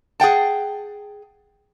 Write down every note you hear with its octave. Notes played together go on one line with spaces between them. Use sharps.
G#4 F#5 G5 A5